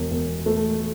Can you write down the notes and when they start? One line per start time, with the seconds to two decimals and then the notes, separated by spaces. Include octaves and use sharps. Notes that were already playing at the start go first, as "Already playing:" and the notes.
Already playing: E1
0.11 E1
0.46 A3